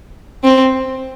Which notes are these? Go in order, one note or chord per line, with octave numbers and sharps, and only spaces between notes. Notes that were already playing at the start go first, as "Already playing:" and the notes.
C4